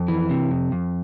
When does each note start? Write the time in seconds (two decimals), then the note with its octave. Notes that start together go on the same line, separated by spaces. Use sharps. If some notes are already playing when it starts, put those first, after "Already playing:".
Already playing: F2
0.08 E3
0.30 C3
0.51 F2
0.72 F2